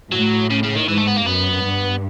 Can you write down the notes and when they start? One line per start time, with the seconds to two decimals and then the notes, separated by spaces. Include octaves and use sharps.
0.12 A2 F#3
0.50 C#3
0.63 C#3
0.75 D#3
0.88 G#2 E3
0.98 A3
1.07 B3
1.17 A#3
1.26 F#2 B3
1.65 G2